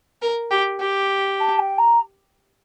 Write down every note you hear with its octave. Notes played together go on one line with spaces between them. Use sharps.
A#4
G4
G4
A5
G5
A#5